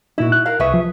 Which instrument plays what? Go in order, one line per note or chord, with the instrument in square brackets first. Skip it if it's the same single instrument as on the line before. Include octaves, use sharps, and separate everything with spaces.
[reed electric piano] A#2 D#4 [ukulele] E4 F#4
[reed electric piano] F#6
[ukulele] A#4 F5
[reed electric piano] C2 C#6 [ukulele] G#4 B4 E5
[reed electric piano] F3